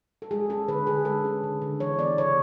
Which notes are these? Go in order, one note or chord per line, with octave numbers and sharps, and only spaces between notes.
A4
G#3 G#4
C#4 A4
D3 B4
D3 G#4
G#3 A4
C#4
D3
D3
E3 C#5
B3 D5
C#3 C#5